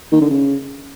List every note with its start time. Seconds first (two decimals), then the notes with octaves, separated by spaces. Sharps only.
0.12 D#3
0.21 D3
0.30 C#3